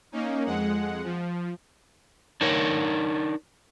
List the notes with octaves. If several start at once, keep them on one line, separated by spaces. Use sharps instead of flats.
A#3 C#4 D#4
F2 G#3 F#5
F3
D4 D#4 A#4 C#5